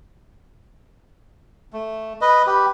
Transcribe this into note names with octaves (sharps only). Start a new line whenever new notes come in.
A3
B4 D#5
G4 B4